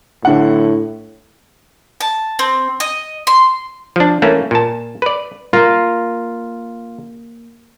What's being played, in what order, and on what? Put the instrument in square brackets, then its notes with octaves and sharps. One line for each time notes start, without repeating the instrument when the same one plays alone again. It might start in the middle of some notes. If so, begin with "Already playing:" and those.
[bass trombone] A2 [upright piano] D3 F#5
[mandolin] A5
C4
D#5
C6
[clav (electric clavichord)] F3 D4
E3 A3 A#3 C#4
A#2 A5
B4 D5
[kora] A#3 [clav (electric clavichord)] F4